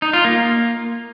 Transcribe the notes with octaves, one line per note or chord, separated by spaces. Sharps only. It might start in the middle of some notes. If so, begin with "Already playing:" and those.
D#4
F4
A#3